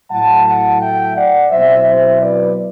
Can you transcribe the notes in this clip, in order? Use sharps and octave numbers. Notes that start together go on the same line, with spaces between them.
A2 F#3 A3 E4 F#5 A5
F#5 A5
E5 G5
D5 F#5
B2 F#3 C4 E4 C5 E5
C5 E5
B4 D5